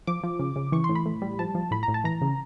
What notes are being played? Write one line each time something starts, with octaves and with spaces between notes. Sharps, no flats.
F3 D6
F3
C#3
C#3
E3 C#6
A2 C6
B5
A2
G3
F3 A5
F3
A2 B5
A#5
A2
A5
E3 A#5
C#3